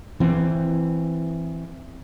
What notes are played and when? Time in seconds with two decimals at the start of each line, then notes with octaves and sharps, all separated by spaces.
0.20 E3 C4